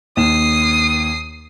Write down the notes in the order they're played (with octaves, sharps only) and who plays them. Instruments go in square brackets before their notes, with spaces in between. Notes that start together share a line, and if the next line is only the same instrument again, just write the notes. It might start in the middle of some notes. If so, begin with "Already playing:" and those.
[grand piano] D#2 E7 [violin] D#6 C7